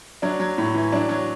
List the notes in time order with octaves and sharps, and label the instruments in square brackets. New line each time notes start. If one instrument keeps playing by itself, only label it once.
[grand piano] F#3 D4
F#3
A2
E3
F#3 D4
F#3